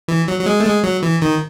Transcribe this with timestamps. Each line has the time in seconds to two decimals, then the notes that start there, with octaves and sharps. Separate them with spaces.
0.08 E3
0.28 F#3
0.39 F#3
0.46 G#3
0.60 A3
0.66 G#3
0.83 F#3
1.03 E3
1.22 D#3